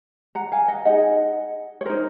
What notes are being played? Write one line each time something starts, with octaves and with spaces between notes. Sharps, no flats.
F#5 A#5
F5 G#5
D#5 F#5
D#4 G#4 D#5 F#5
C#5
D#4 A#4 C5